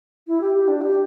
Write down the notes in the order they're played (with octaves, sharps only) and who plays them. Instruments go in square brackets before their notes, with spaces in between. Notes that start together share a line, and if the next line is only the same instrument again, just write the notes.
[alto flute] E4
G4
G4
D4
G4